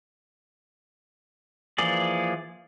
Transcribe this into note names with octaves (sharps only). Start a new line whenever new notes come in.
E3 F3 A#3 G#4 D5